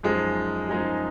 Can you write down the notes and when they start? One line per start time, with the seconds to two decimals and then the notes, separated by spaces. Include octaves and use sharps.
0.03 F#2 F3 G#3 D#4 G#4
0.69 F#2 F3 G#3 D#4 G#4